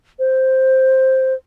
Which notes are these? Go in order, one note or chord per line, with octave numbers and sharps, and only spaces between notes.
C5